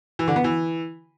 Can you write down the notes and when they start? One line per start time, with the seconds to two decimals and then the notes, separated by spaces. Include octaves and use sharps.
0.19 E3
0.28 D3
0.36 B3
0.44 E3